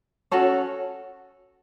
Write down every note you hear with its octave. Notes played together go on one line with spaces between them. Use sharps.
C#4 F#4 A4 C#5